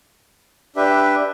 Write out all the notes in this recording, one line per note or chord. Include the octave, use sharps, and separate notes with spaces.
D4 G4 B4 E5